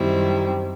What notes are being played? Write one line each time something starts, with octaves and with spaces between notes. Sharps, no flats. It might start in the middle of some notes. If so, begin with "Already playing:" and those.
Already playing: F#2 D#3 G3 C4 E4